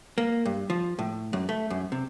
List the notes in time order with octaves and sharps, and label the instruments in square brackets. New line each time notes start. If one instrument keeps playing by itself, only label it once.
[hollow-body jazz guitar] A#3
G2
F3
A2
F#2
A3
F#2
C3